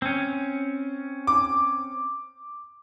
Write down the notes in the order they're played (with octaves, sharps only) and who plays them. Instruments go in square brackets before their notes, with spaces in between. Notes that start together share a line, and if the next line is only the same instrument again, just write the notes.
[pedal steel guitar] C4 C#4
[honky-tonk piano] D6